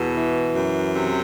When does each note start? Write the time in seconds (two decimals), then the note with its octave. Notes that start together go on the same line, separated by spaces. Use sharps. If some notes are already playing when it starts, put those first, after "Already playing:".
Already playing: E2 B2
0.15 E3
0.55 F#2
0.94 C3